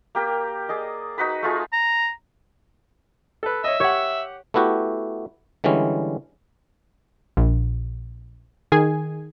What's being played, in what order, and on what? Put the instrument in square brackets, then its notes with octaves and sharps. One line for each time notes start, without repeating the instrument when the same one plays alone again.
[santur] A#3 G4 A#4
G#4 D5 D#5
D#4 F#4 B4 B5
A3 F4 G#4
[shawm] A#5
[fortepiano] A4 B4
[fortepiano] C#5 D#5 [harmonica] E5
[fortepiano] G4 F#5 [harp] C#5
[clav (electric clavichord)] A3 B3 E4 F#4 G4
D3 E3 G3 G#3 C#4
[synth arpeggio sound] A#1
D#3 G#4 G#5